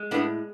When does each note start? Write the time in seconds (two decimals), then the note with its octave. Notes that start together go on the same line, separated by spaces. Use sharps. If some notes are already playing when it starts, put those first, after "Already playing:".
Already playing: G#3
0.11 A2 B3 D4